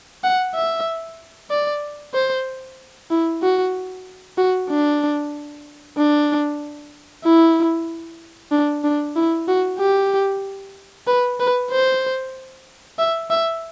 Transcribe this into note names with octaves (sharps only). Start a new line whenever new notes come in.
F#5
E5
D5
C5
E4
F#4
F#4
D4
D4
E4
D4
D4
E4
F#4
G4
B4
B4
C5
E5
E5